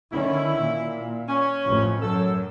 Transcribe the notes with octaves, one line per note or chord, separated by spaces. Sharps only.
D3 D#3 C#4 E4
A#2
C#4
A1 F2
F#2 A4